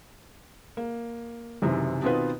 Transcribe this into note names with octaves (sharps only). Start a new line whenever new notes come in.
A#3
F#1 F#2 C3 D#3 E3
B2 D#3 B3 C4 F4 B4